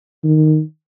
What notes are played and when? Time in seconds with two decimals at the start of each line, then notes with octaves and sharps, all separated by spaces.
0.24 D#3